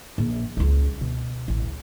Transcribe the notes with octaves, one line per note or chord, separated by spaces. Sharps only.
A#1
C#2 C#4
B2
A1
C#2